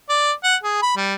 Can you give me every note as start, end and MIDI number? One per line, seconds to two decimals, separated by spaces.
0.09 0.32 74
0.44 0.56 78
0.63 0.81 68
0.82 0.93 83
0.97 1.15 55